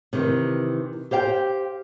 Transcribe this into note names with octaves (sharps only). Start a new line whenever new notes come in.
C3 D#3 E3
G4 C5 F5 G5